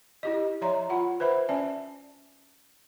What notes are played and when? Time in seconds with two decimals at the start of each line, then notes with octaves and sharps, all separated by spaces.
0.23 E4 G4 D#5
0.62 F3 C#5 D5 E5 A#5 C6
0.89 F4 F#5 B5
1.20 B4 C5 E5 B5
1.49 C#4 D5 E5 A5